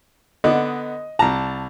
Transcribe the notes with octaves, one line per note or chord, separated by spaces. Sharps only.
D3 B3 D#5
C2 A5 A#5